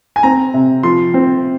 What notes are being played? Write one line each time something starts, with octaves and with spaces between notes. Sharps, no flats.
G#5
C4 A#5
C3
F3 C6
C4